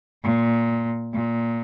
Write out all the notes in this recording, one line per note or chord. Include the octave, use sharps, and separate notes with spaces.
A#2
A#2